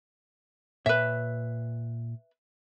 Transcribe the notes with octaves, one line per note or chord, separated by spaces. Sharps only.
A#2 B4 C#5 E5